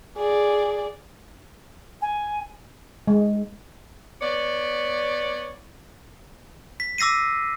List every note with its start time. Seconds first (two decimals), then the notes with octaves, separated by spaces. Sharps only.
0.17 G#4 D5
2.01 G#5
3.07 G#3
4.21 B3 C#5 D5
6.80 B6
6.98 D6 E6 A#6 C7 D#7